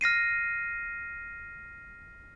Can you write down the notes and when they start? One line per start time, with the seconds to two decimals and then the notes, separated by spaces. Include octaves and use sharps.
0.01 F6 A#6 C7 D#7